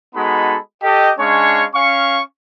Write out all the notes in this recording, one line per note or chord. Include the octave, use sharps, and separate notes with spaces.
G#3 B3 D#4 F#4 A4 B5
G4 A4 D#5
G#3 C#4 D4 C#5 F5 C#6
C#4 F5 C#6